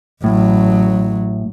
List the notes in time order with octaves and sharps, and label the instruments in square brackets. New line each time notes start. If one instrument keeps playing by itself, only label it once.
[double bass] A1 F#3 [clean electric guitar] A2